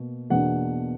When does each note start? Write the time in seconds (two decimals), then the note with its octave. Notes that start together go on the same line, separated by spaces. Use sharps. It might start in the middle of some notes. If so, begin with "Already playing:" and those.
Already playing: B2 A#3
0.30 E2 B2 A#3 D4 F#5